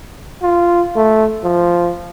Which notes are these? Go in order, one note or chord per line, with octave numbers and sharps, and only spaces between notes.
F4
A3
F3